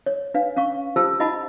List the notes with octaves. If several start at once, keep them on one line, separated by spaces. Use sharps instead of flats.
C#5
D4 B4 F5
C#4 F5 C#6
F4 G4 A4 C5 A5 E6
D#4 E4 D#5 F#5 A5 B5